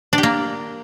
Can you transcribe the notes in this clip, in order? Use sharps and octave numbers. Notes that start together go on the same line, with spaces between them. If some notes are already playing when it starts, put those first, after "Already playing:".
D4
G4
A#3